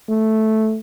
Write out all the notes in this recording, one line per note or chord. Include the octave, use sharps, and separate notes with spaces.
A3